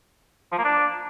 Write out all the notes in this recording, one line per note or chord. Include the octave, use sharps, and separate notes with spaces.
F3
A#3
D4